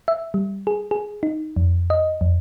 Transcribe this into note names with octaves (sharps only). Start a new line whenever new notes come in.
E5
G3
G#4
G#4
D#4
F2
D#5
F2